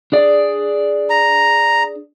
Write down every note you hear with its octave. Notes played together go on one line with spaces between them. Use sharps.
D4 G#4 D5
A#5